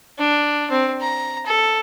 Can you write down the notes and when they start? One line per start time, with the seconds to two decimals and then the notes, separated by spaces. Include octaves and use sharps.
0.19 D4
0.70 C4
1.01 A#5
1.46 A4